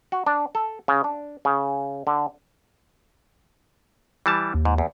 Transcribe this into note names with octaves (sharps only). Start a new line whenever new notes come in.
F#4
D4
A4
C#3
D4
C#3
D3
E3 G3 A5
D#2
G#2
E2